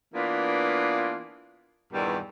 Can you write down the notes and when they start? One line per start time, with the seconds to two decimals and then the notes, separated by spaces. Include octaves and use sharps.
0.14 E3 A#3 B3 D4 F4
1.93 E2 G2 A#2 D#3 E3 G3